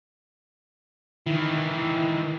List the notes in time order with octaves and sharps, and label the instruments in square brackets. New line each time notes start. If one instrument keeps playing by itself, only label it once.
[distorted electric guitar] D#3 E3 [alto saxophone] E4